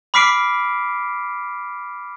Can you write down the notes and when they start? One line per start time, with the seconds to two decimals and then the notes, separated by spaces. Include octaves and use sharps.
0.14 B5 D6 F6 B6 C7 D7